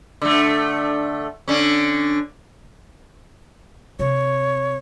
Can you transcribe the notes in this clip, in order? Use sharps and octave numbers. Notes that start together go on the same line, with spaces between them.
D3 A3
D3 C#4
C3 C#5